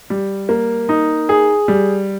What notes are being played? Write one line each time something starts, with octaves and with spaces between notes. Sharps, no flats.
G3
A#3
D#4
G#4
G3